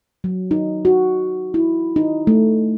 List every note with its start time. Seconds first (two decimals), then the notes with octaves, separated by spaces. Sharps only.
0.24 F#3
0.51 D#4
0.85 F#4
1.54 E4
1.96 D#4
2.27 A3